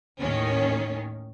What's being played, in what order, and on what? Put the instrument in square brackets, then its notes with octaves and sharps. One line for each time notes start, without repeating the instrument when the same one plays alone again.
[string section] D#2 A2 D#3 C#4